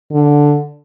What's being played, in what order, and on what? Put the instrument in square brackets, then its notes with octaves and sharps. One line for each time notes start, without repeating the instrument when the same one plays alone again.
[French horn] D3